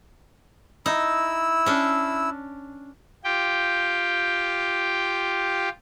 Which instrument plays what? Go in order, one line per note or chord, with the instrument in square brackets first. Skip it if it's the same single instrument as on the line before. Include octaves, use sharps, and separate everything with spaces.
[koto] D#4 [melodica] E4 E6
[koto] C#4 D4
[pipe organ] F4 G4 G5